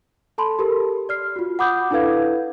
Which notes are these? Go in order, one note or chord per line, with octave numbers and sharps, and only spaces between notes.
A4 A5 B5 C6
G4 A4 A#4
D5 F6 C7
F4 F#4
F#5 B5 D6 D#6 G6
D4 E4 A4 B4 F5 G#6